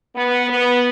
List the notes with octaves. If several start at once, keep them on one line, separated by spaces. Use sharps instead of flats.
B3
B3